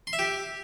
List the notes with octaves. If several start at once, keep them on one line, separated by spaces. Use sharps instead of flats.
C6
E5
G4